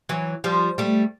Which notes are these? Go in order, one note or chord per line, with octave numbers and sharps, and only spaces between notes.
E3 F#3
F3 G3
G3 A3